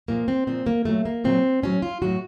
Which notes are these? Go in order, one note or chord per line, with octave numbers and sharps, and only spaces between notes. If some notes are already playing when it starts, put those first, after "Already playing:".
A#2 F3 A#3
C4
A#2 F3 C4
A#3
A#2 F#3 A3
A#3
A#2 F#3 C4
A2 F#3 C#4
F4
A2 F#3 F#4